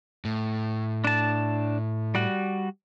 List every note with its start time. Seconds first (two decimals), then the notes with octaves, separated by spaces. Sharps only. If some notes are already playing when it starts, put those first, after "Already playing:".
0.25 A2
1.04 D4 A5
2.15 G3 F#4